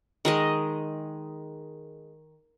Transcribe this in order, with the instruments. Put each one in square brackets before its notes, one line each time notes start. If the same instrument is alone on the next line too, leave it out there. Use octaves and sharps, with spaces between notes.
[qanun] D#3 G#3 D#5